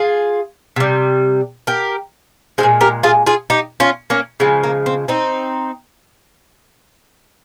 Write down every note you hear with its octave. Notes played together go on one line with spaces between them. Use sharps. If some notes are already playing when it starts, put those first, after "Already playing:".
Already playing: F4 G#4
C3 G3
G4 A#4
F3 G#3 G#4 C5
A#2
G4 A#4
F4 G#4
F4 G#4
D#4 G4
C#4 F4
A#3 C#4
C#3 F3 G#3 C4
A#3
C4
C4 D#4